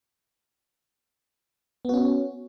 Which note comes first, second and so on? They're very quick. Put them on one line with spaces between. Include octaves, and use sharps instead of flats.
B3 F#4 C#4